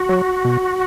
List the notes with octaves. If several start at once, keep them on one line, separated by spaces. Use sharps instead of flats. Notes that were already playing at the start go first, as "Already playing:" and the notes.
Already playing: F#4
F#3
B2